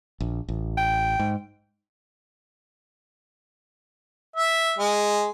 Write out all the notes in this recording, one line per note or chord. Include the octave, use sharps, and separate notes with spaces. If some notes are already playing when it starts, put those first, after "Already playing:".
A#1
A1
G5
G#2
E5
G#3